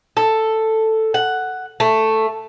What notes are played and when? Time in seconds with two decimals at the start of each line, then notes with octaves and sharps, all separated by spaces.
0.17 A4
1.14 F#5
1.80 A3